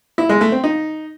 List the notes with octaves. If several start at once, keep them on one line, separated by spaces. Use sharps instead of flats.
E4
G#3
A3
C4
D#4